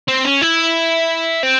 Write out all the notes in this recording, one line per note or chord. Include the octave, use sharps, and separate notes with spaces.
C4
C#4
E4
C4